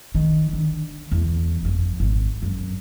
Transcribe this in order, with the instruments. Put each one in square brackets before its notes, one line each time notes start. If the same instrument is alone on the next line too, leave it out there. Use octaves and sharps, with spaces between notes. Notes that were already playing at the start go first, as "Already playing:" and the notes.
[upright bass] D#3
D3
E2
G1 F2
G#1
F#2